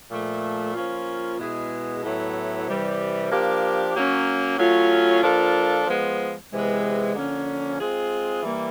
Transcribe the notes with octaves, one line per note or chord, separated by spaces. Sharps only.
A#2 F3 A3
F3 A#3 C#4 F4
B2 G#3 B3 E4 G#4
A2 F#3 B3 E4 A4
C3 E3 G3
F3 A#3 D4 G4
F#3 A#3 C#4
F#3 A3 C#4 F4
F3 A#3 D4 F4 A4
F3 G#3 B3
C3 E3 G#3 B3
D3 F3 A#3 C#4
G#3 C4 F4 G#4
E3 G3 A#3